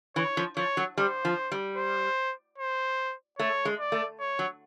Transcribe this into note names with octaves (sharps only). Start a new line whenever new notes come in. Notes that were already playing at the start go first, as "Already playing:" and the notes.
E3 C#5
F3
F3 C#5
F#3
G3 C5
F3
G3
C5
C5
A3 C#5
G#3
D5
A3
C#5
F#3